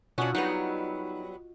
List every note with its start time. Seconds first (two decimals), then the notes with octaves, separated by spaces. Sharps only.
0.18 B2 C#4 D4 F4 F#4 D#5
0.35 F#3 G3 B3 D#4